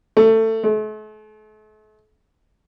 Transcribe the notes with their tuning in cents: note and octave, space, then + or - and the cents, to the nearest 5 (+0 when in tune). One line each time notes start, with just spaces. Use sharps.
A3 +20
A3 -40